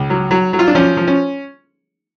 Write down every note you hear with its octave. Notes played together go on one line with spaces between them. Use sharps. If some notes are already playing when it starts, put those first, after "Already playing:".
Already playing: C#2
F#3
F#3
F#3
F4
D4
F3 C#4
F3
C#4